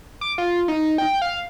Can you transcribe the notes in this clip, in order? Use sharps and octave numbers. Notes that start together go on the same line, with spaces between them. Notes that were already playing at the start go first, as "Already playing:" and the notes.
D6
F4
D#4
G5
F5